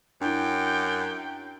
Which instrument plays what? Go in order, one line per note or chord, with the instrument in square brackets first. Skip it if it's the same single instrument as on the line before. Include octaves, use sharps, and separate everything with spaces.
[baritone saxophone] F#2 [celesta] D4 E4 [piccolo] G5